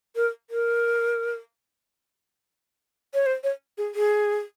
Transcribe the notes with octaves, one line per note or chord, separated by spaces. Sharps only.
A#4
A#4
C#5
C5
C#5
G#4
G#4